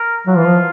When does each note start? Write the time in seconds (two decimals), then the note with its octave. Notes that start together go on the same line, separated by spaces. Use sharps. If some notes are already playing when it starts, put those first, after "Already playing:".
Already playing: A#4
0.27 F#3 F4
0.37 E3
0.46 F3